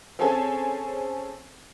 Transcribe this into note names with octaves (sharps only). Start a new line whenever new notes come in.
C4 C#4 G#4 A4 G#5 A5